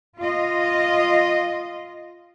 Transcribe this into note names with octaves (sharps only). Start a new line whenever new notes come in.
F4 D#5